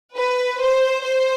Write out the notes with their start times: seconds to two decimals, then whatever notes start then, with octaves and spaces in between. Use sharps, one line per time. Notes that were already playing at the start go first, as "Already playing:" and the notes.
0.15 B4
0.59 C5
1.03 C5